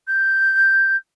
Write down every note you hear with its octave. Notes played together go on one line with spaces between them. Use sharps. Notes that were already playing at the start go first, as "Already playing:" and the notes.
G6